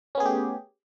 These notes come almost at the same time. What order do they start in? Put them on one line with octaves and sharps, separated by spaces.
C#4 B3 G#4 A3 G4